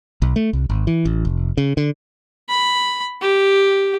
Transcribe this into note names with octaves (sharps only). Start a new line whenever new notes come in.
B1
A3
C2
G#1
E3
A1
F1
C#3
D3
B5
G4